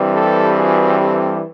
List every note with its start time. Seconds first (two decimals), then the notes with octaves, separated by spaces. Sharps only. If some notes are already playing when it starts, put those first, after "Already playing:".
Already playing: G2 E3 G3 C4
0.13 G4 A4
0.57 F#4 G#4
1.00 G4 A4